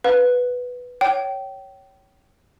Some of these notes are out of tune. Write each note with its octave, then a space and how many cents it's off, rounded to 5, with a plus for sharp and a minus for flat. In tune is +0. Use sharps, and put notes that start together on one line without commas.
B4 +0 F5 +40
C#5 +0 G5 -25